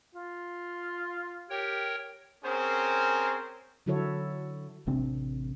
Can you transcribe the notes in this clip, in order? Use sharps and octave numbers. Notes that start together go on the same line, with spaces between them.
F4
G4 A#4 C#5 G5
C4 C#4 G#4 A#4 C5
D3 F#3 E4 F#4 A4 C#5
A1 C3 C4 D4